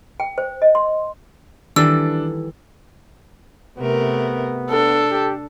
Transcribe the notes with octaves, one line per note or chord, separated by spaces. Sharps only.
G5
C5
D#5
C6
D#3 E3 G3 D4 A4 E6
C3 A3 B3 A#4
D4 A4
G4